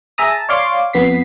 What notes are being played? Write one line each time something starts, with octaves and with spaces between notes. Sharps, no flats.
G#4 E5 A#5 D#6
A5
C#5 D5 F5 C6 D6
F2 B3 B6 C7